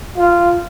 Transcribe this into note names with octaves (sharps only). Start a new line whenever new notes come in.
F4